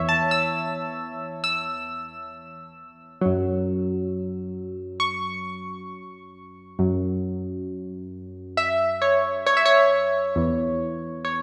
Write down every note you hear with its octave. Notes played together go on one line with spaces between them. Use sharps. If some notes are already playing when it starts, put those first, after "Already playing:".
Already playing: E2 E3 C#5 E5
A5
E6
E6
F#2 F#3
C#6
F#2 F#3
E5
C#5
C#5
E5
C#5
E2 E3
C#5